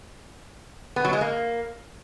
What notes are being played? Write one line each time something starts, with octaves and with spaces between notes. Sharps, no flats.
B3
F#3
G#3
A#3